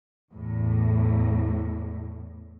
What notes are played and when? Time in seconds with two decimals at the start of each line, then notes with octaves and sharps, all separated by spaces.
0.31 E2 A2